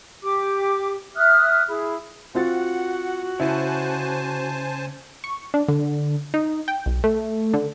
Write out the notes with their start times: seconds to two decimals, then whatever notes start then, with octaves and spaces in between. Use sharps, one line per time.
0.22 G4 D6
1.15 E5 D#6 F6 F#6
1.67 E4 G#4
2.35 C4 F4 F#4 F#5 A6
3.40 C#3 E4 C5 G#5 A5
5.24 C#6
5.54 D4
5.68 D3
6.34 D#4
6.68 G5
6.86 B1
7.04 A3
7.54 D3